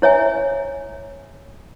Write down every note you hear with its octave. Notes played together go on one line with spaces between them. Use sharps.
E4 C#5 E5 G#5